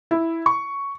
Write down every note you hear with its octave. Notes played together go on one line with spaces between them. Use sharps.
E4
C#6